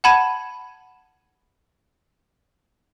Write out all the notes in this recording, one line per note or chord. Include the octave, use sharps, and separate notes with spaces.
F#5 A5 B5 G#6 D#7